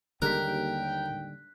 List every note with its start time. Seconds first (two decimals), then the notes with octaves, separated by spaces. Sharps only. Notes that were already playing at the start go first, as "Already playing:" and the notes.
0.22 D#2 D3 G3 G#3 A#4 G5 F#6 B6